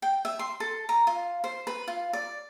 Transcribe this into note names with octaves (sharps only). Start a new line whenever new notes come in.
G5
E5
C6
A4
A#5
F4
C5
B4
F4
D5